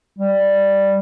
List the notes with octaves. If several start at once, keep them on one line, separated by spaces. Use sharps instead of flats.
G3